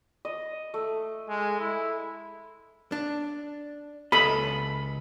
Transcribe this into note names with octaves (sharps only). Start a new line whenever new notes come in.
D#5
A3
G#3
E4
D4
C#2 A4 D#5 B5